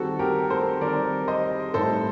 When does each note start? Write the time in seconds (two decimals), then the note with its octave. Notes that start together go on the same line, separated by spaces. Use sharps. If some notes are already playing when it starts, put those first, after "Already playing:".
Already playing: D#3 G3 C4 F#4 A4
0.19 G4 A#4
0.50 A4 C5
0.81 D#3 G3 C4 A#4 D5
1.28 C5 D#5
1.74 A2 G3 C4 D#4 A4 C5